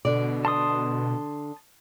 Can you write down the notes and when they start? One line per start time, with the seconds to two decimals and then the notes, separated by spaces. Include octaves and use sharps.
0.05 B2 D3 D5
0.45 A5 C6 D#6